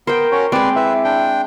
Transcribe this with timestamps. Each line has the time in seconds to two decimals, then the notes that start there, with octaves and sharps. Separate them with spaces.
0.07 B3 A#4 C5 G5
0.32 C#4 F#4 C#5
0.52 G#3 C4 B4 D5
0.76 E4 B4 E5
1.04 D4 G5